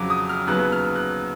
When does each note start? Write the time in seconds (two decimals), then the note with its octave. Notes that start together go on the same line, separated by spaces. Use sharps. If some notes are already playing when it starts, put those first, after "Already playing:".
Already playing: F2 C#3 F#3 D6
0.10 D#6
0.29 F6
0.47 D#2 C#3 F#3 B3 F#6
0.72 F6
0.95 F#6